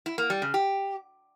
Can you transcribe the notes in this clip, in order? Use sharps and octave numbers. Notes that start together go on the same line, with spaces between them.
E4
A#3
G3
C#3
G4